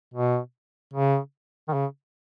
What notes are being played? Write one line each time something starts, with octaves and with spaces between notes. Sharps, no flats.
B2
C#3
D#3
C#3